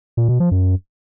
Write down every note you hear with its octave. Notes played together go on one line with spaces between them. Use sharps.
A#2
B2
F3
F#2